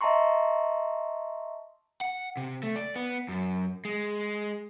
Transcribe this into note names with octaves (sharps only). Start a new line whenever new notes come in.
D#5 E5 A5 A#5 C6 C#6
F#5
C3
A3
D5
B3
F#2
G#3